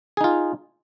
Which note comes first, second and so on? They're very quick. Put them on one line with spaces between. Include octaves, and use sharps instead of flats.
G#4 D#4 F4